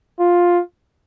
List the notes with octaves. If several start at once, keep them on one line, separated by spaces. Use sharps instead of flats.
F4